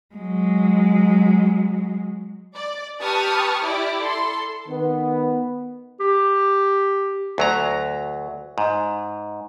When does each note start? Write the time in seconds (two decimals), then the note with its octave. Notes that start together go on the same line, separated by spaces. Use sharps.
0.15 F#3 G#3
2.55 D5
3.00 G4 B4 A5 C#6 D#6 F6
3.63 E4 G4 D5 D6
4.01 A4 C6
4.68 D#3 B3
6.00 G4
7.38 D2 F#3 A#5
8.58 G#2